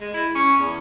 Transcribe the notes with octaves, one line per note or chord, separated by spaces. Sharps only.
G#3
E4
C#4
E2